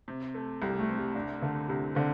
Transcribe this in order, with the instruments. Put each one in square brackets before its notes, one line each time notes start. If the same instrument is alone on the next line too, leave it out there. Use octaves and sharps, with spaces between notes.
[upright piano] C3
A3
[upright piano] C2 [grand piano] G3
[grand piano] A3
[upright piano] C4
[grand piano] G3
[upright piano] C3 [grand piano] D4
[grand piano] D3 [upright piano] A3
[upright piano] C2 [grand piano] C3
[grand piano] D3 [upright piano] C4